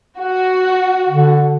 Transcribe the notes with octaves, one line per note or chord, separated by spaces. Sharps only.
F#4
D3